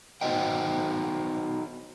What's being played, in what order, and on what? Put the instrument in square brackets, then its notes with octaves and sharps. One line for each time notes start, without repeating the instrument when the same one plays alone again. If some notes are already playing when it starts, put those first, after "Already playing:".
[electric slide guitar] B3 D#4 F#4 C5 D#5 G5